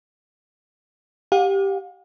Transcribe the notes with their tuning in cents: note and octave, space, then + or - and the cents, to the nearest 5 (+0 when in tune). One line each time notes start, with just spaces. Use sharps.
G4 +0 F5 +45